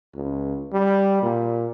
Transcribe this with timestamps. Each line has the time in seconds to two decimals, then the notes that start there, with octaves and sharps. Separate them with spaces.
0.15 C#2
0.73 G3
1.22 A#2